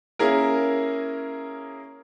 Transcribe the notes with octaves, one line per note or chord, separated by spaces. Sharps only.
A#3 C#4 E4 G#4 A#4